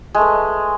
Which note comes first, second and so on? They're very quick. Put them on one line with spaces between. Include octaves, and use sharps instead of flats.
G#3 A3 B4